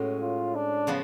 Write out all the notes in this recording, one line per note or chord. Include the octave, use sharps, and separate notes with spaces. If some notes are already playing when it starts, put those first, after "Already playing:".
Already playing: A2 G#3 C#4 F#4
F4
D4
C#3 F3 B3